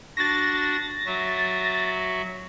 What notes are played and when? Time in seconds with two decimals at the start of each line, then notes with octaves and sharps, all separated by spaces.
0.17 D4 F#4 A6 A#6
1.06 F#3 F#4 E5